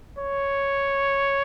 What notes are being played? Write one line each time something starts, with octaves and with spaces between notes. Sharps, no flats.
C#5